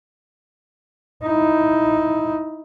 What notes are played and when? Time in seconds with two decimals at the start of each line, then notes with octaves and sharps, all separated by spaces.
1.23 D#4 E4